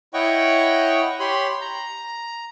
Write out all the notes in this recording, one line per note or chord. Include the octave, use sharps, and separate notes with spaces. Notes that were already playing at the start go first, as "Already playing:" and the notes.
E4 C#5 D#5 F#5 G5 C#6
G4 C#5 B5 C6
A#5